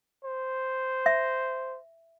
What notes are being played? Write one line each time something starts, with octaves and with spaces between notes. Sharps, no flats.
C5
E5